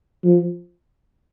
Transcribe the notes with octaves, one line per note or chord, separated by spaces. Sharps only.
F3